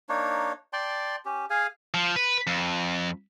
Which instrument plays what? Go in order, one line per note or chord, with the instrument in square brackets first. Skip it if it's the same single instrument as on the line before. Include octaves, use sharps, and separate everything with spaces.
[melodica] A#3 D4 D#4 C#5
D5 G5 A5 C6
C#4 G4
G#4 F5 G#5
[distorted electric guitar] F3
B4
F2